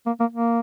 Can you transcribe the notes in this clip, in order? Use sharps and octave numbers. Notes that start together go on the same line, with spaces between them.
A#3
A#3
A#3